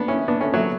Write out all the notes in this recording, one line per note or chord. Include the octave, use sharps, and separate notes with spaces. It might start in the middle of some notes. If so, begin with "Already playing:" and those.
Already playing: B3 D4
C#4 E4
B3 D4
A3 C#4
F#3 A3